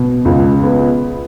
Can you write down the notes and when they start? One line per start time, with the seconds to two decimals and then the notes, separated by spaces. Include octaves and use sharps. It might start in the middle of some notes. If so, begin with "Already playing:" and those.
Already playing: B2
0.25 C#2
0.63 B3